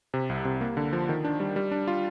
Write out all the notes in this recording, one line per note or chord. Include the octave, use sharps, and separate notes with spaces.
C3
C2
C3
A#3
D3
F3
D#3
D4
G3
G3
D4
F4